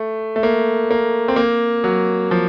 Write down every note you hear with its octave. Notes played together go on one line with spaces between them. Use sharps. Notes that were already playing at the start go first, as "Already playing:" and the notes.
Already playing: A3
A3
A#3
A#3
C4
A#3
F#3
F3